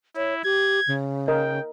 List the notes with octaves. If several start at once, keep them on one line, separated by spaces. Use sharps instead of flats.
E4 C#5
G4 G#6
C#3
A#4 D#5 G5